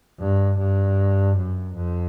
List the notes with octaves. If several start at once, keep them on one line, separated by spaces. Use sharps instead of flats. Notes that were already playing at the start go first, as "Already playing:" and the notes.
G2
G2
F#2
F2